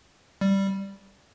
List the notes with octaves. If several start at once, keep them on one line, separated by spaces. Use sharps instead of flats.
G3